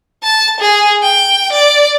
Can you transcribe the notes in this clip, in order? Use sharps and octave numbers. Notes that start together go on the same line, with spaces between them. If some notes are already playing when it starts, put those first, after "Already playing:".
A5
G#4
G5
D5